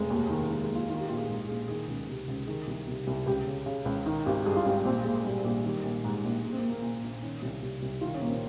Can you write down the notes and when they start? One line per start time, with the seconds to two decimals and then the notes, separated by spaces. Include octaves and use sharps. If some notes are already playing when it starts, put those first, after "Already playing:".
Already playing: F1 G#3
0.10 D#2
0.30 D#3
0.50 D#3 G#3
0.63 G#3
0.69 D#2
0.75 F4
0.90 D#3 F4
0.99 G4
1.09 A#1 F4
1.18 G#4
1.29 G#2 G#4
1.48 A#1 G#4
1.68 D#3 G#4
1.88 C#2
2.08 C3
2.28 C#2
2.47 D#3 G#4
2.67 C2
2.87 C3
3.07 C2
3.26 C#2 G4
3.47 C#3
3.66 C#3
3.85 C#2
4.06 D#3 D#4
4.26 G#1 G4
4.45 G2 G#4
4.56 F4
4.66 G#1 G4
4.85 A#1 C4
5.05 A#2 G#3
5.25 A#2 G3
5.44 A#1 G3
5.64 D#3 G3
5.83 A#1
6.04 G#2
6.24 A#1
6.43 A#1 G#3
6.52 C4
6.57 A#3
6.63 A#2
6.70 A#3
6.82 A#2
7.03 A#1
7.22 D#3 C#4
7.42 C2
7.62 C3
7.82 C2
8.01 D#3 F4
8.15 C#4
8.21 A#1 A#3
8.28 C4